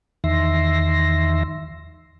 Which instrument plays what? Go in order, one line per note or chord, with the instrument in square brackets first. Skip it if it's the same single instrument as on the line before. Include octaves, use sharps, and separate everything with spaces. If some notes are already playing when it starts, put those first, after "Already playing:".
[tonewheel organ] E2 D#3 E5 C6 A#6